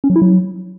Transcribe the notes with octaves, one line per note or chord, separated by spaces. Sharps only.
C#4
F#3
E4
F#3